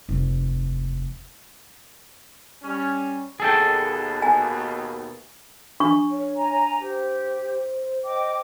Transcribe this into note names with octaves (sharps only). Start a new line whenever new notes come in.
F1 D#2
G3 C#4
D#2 B2 G#4 A4 G5
G#5
D4 C#6
C#5
G#5 A#5
G4 C5
D#5 G5 D6